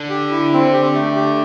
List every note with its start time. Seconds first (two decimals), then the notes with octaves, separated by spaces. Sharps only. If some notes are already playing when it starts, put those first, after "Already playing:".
Already playing: D3
0.09 G4
0.31 E4
0.53 C4
0.73 G4
0.95 A3
1.16 G4